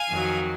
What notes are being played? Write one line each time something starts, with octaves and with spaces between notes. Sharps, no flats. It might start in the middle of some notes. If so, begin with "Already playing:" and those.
Already playing: F5 G#5
F2 D#3 F#3